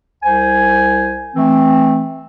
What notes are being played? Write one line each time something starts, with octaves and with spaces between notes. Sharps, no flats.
C2 C5 G#5
E3 A3 C4